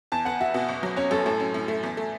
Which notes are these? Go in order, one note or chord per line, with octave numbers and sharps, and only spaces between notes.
E2 A5
B3 F#5
F#4 E5
B2
F#1
F#3
C#4 C#5
F#2 A4
A2 A4
C#4
A2
A3
E2
A3